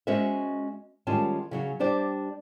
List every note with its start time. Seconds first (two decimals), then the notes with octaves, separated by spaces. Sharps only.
0.07 G#3 C#4 F#4 C5 D#5 E5
1.07 D#3 G3 G#3 C#4 F4 A5
1.51 C#3 F#3 C#4
1.79 G3 D4 G4 C5 D5